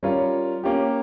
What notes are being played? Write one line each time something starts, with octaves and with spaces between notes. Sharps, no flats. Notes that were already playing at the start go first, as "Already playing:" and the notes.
G3 C#4 F4 A#4 C#5
A#3 C#4 G4